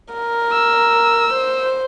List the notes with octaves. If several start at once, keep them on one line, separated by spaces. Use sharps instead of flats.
A#4
E6
C5